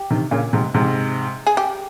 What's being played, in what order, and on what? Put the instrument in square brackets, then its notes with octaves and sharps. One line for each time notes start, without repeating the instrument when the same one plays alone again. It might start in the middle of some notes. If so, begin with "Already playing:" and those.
Already playing: [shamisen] G4
[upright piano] C3 D#3
A#2 C#3
G#2 C3
G#2 C3
[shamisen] G#4
G4